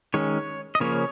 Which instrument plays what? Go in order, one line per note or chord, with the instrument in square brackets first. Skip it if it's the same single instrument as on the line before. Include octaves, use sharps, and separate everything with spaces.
[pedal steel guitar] D#3 G#3 C#4 C#5
D#5
C#3 F3 A#3 C#4 C#5